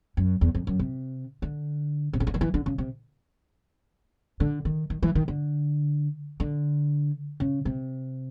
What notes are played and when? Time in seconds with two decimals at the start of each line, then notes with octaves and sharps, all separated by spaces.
0.17 F#2
0.41 E2
0.55 F2
0.67 F#2
0.79 C3
1.42 D3
2.13 C3
2.20 C#3
2.27 D3
2.34 D#3
2.41 E3
2.54 D3
2.66 C#3
2.78 C3
4.40 D3
4.65 D#3
4.90 D#3
5.03 E3
5.15 D#3
5.28 D3
6.40 D3
7.40 C#3
7.65 C3